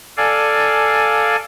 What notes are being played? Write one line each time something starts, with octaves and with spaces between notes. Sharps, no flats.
A4 D5 F5 G#5